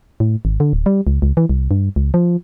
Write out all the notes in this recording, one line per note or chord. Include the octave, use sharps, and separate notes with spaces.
A2
G#1
D3
D1
G3
C#2
C#2
E3
C2
G2
C#2
F3